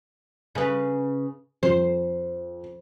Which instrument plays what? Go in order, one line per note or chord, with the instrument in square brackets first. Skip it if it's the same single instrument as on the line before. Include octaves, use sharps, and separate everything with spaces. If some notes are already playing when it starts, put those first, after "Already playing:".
[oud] C#3 B4
[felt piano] F2 [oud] C5